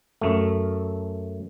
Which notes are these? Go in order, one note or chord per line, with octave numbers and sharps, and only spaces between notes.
F#2 A3